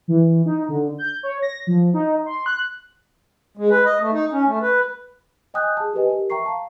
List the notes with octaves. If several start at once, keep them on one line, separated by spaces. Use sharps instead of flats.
E3
D#4
D3
G6
C#5
A#6
F3
D#4
C6
F#6
G#3
B4
D#5
A3
D#4
C#4
A3
B4
D#5 G5 G#5 D#6 F#6 G6
G#4 A5
G4 A#4 B4 D#5 G#5
G4 A#4
E5 G5 A#5 C#6 C7
F5 A5